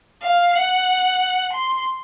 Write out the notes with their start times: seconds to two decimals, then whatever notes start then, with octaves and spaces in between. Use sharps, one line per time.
0.22 F5
0.55 F#5
1.53 C6